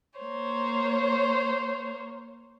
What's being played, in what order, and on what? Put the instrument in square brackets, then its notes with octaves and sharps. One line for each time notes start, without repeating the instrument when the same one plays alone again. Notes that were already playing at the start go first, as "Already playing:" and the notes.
[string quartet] A#3 C5 C#5